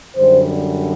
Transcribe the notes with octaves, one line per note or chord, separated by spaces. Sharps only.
F#2 D3 G3 C5